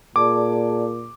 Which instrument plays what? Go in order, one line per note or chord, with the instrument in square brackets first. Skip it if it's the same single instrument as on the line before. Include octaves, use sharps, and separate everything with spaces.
[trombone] A#2 [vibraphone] G#4 D5 A5 [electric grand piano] D6